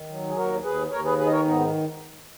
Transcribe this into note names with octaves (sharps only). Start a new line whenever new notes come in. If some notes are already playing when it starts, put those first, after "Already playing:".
Already playing: D#3
F#3
G#4
D#2 F#4 A#4
D#2 G#4 B4
D#2 A#4 C#5
G#4 B4
D#3 G#4 B4
D#5
A#4 C#5
G#2 B3 D#4